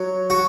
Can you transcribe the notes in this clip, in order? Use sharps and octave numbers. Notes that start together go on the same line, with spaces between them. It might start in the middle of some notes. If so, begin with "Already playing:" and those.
Already playing: F#3
F#4